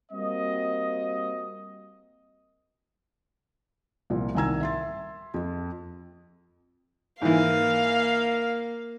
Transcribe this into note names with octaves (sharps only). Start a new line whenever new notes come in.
G3 A#3 C4 F#4 D#5
C2 A#2 F3
C2 D#3 G#5 A#5 E6 G#6
E5 C6 A6
F2
G#2 E3 A#3 F5